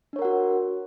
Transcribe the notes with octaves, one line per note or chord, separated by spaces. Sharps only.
D4 F#4 A#4 C#5 F#5